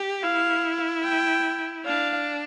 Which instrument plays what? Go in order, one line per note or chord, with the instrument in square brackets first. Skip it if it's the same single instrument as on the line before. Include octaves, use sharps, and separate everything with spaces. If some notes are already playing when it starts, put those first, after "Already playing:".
Already playing: [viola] G4
[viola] E4 [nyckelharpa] F5
[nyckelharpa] G5
[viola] D4 [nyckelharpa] F5